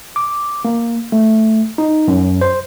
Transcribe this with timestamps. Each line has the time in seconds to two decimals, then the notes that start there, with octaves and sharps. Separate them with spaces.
0.16 D6
0.65 A#3
1.12 A3
1.78 D#4
2.08 F#2
2.41 C5